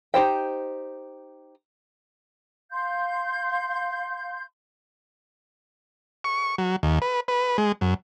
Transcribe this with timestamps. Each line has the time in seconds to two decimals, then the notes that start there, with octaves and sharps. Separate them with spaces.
0.14 D#4 G4 C5 G5
2.72 F5 C6 G6
6.24 C#6
6.58 F#3
6.83 D#2
7.02 B4
7.28 B4
7.58 G#3
7.81 F#2